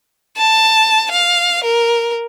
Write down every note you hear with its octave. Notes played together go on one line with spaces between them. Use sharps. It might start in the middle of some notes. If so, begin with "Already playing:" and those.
A5
F5
A#4